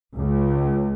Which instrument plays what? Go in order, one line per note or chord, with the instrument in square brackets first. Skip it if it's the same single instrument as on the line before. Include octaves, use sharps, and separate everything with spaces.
[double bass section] C#2